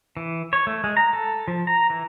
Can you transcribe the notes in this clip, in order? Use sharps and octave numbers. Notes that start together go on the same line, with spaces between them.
E3
C#5
A3
G#3
A#5
A4
F3
A#5
E3